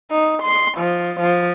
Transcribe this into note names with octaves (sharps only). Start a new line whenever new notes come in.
D#4
C6
F3
F3